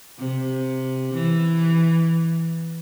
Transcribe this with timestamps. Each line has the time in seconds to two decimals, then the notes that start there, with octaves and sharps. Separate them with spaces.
0.19 C3
1.14 E3